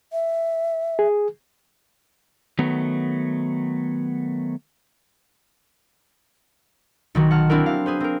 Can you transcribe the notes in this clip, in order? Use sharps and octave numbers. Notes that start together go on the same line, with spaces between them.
E5
G#4
D#3 F#3 A3 B3
B1 D#3 F#4
F#5 A5 F6
C4 D4 E4 F#4 A#4
F5
G#4 B4 C5
C4 A#4